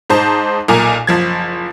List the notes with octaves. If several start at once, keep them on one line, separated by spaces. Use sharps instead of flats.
G#2 D#4 C5 A5
B1 A#2 A#4 G#5
F#1 F3 G#6